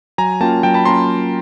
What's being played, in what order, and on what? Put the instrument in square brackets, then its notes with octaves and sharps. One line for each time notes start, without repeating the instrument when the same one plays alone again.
[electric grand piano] F#3 G#5 A#5
A#3 C#4 F4 G5 A5
F#3 G5 A5
A5 B5
A#3 C#4 F4 A#5 C6